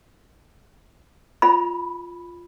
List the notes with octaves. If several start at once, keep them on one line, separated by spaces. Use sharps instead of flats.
F4 B5